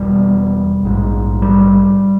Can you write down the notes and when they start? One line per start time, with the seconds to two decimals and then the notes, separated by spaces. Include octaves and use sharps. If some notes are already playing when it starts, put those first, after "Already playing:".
Already playing: E1 E2 B2 G3
0.83 A#1 G#2
1.42 G3